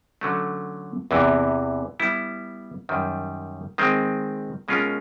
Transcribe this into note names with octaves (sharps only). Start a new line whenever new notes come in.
D3 F#3 A3 C#4
E2 C3 E3
G3 B3 E4
F#2 D#3 G3
D#3 G#3 C4
B2 G#3 C#4 F4 A#4